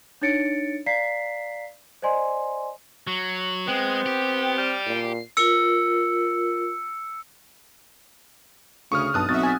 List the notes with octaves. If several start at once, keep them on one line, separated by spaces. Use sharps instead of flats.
D4 D#4 C#5 A6 C#7 D7
D5 F5 A#5 B6 C7
C5 D5 D#5 G#5 C6
F#3 C#6
G#3 B3 C4 G5
G4
G3 F6
A#2 C7
F4 A#4 E6 C#7
D2 C#3 C#6 D#6 F6
B1 G2 A5 D#6 F#6
B1 C4 F#4 E5 A6
G#5